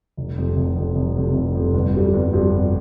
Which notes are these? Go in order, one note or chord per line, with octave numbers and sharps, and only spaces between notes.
F1
F2 C3
F1
F2 C3
F1
F2 C3
F1
F2 C3
G1
F2 C3 G3
G1
F2 C3 G3
G1